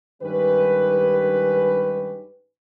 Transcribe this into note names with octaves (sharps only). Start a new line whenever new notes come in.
G2 D#3 G#3 C#4 G4 B4